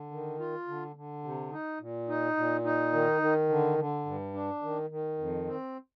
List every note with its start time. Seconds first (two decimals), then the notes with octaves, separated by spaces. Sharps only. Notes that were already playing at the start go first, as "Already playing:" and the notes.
Already playing: D3
0.11 D#3
0.40 F4
0.68 D3
0.96 D3
1.24 C3
1.52 D#4
1.80 A#2
2.09 D#4
2.37 A#2
2.65 D#4
2.93 D#3
3.22 D#3
3.49 D3
3.78 D3
4.06 G2
4.34 D4
4.62 D#3
4.90 D#3
5.18 F2
5.47 C4